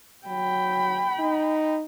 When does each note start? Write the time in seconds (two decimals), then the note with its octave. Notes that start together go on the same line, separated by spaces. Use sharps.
0.27 F#3 G5 B5
1.19 D#4